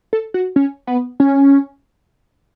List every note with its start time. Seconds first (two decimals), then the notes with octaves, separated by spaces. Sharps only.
0.13 A4
0.34 F#4
0.56 C#4
0.87 B3
1.20 C#4